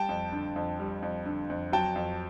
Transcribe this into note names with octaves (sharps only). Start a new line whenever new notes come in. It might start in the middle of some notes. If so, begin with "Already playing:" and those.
Already playing: G3 G5 A5
F2
D3
F2
G3
F2
D3
F2
F#3 G5 A5
F2